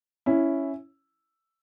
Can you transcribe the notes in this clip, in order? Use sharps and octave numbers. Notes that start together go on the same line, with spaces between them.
C#4 E4